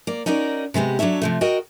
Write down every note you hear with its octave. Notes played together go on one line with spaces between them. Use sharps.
A#3 D5
C#4 D#4 F#4 A#4 D5
C3 G#3 B3 G4
F#3 D4 A4 C#5 E5
C3 F3 A3
F#4 A#4 D#5 G5